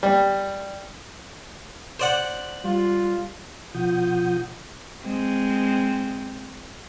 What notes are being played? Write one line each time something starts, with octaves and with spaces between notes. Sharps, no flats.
G3
C5 D5 F#5
G3 F4
B2 F3 F4 F#5 D#6 G6
G#3 C4